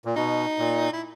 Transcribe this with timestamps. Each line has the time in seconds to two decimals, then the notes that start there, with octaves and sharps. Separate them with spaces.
0.05 A#2
0.16 B2 D#4
0.59 A#2
0.93 E4